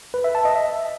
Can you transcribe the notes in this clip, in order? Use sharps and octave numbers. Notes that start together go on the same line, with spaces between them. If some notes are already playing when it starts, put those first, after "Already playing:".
B4
E5
A5
D#5
E5